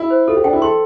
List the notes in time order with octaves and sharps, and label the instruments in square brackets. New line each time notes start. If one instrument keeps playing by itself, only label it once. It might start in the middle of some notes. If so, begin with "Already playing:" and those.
Already playing: [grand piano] E4
[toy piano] C5
[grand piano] F4 [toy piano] A4
[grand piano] G4
[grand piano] D4 [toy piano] G5
[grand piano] E4
[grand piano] A4 [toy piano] C6